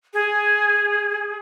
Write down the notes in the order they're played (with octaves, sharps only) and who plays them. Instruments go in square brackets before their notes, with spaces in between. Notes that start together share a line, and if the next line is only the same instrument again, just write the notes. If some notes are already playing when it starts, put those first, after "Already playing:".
[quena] G#4